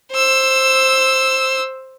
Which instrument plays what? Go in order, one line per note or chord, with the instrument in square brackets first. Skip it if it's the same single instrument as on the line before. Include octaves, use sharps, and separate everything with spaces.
[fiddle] C5 E6